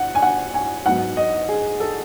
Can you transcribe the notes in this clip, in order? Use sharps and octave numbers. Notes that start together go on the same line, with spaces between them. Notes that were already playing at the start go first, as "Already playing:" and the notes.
Already playing: F#5
G#5
F#5
G#5
G#2 F#3 B3 D#4 F#5
D#5
G#4
A4